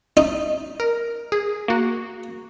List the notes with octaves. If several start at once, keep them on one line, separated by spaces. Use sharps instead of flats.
D#4
A#4
G#4
A#3 F#4